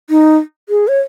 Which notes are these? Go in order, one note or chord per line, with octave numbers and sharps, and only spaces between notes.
D#4
G#4
C#5